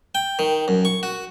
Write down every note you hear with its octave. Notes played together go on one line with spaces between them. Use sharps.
G5
D#3
F#2
C#6
F#4